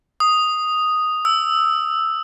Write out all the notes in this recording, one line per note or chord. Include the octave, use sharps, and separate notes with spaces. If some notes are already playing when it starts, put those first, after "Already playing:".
D#6
E6